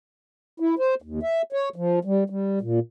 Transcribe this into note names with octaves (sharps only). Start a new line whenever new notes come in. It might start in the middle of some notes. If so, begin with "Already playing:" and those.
E4
C5
D#2
E5
C#5
F3
G3
G3
A#2